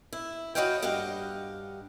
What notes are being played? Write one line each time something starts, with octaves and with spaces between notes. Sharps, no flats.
E4
F#4 B4 C#5 D#5 F5 G5
G2 G4 D#5 F5 F#5